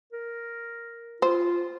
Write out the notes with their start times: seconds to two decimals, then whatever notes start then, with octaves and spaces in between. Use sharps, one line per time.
0.13 A#4
1.22 F4 C5